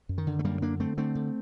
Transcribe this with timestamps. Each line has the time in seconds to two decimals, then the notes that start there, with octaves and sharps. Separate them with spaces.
0.09 F#2
0.18 D#3
0.27 D3
0.39 A3
0.44 F#2 G3 A#3
0.62 D3 A#3 D4
0.80 D3 A3 C4
0.98 D3 A3 C4
1.15 D3